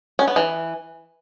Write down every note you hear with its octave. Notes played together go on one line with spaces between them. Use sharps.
C#4
B3
E3